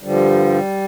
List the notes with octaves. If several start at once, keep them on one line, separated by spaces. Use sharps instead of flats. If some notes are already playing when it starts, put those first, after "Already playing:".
G2 D3 F3 G3